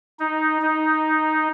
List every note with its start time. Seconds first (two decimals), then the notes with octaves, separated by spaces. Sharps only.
0.19 D#4
0.62 D#4